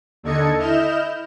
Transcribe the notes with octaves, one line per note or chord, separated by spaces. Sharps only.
D#2 D3 A4 D#5 G#6 C#7
E4 D#5 F6 G6 E7